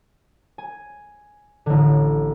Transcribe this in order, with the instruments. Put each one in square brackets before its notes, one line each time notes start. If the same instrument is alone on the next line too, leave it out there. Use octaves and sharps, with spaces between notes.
[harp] G#5
A1 D3